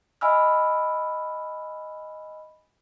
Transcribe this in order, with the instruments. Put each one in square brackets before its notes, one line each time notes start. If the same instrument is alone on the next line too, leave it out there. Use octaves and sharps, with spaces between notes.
[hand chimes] D#5 E5 G#5 B5 E6 F6